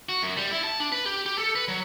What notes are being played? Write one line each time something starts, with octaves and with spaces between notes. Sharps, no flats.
F#4
F#2
G3
E4
A5
D4
B4
G4
G4
A4
B4
F#3